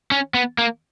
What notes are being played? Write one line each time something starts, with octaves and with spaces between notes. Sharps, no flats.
C#4
B3
A#3